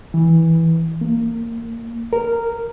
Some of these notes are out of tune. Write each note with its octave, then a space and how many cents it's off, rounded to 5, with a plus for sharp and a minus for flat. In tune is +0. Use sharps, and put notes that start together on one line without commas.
E3 -5
A#3 -20
A#4 -10